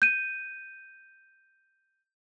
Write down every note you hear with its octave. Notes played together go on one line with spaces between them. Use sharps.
G6 D#7